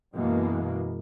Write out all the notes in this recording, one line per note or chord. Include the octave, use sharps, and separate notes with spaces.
F#2 B2 E3 G#3 A#3